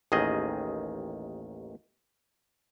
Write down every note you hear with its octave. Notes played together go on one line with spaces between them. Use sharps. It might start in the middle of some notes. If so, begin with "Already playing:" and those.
A1 D#2 D#3 G#4 D#5